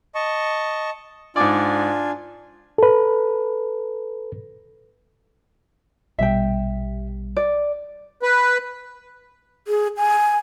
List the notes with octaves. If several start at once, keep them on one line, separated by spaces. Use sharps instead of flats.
D#5 A5 C#6
G#2 D4 F4 D5 G#5
A4 B4
A#1 B2 G3 E5 G5
D5
B4
G#4
G#5